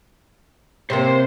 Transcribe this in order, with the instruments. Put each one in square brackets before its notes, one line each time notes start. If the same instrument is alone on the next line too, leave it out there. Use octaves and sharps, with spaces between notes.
[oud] C3 A#3 [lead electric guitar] C5 C6